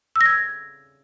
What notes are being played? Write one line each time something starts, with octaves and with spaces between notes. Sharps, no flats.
E6
A#6
G#6